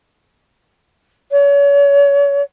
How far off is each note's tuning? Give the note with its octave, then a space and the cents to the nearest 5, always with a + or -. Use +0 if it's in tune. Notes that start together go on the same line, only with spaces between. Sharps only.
C#5 +35